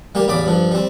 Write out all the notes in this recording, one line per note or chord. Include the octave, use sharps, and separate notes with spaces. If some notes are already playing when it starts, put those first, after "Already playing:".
G3 A#3 G4
A1 E2 C#3 D5 B5 D6
G2 F3
G3 C4